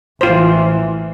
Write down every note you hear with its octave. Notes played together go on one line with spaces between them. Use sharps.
A1 E3 F4 C5